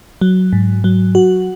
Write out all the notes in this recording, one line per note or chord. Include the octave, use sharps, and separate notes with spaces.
F#3
G#2
F#3
F#4